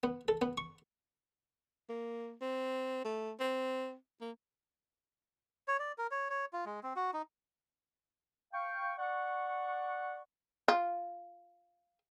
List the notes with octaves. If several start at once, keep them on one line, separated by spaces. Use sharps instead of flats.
B3
A4
B3
C#6
A#3
C4
A3
C4
A#3
C#5
D5
A#4
C#5
C#5
F4
G#3
C4
F#4
D#4
F5 G5 C#6
D5 F#5 C#6
F4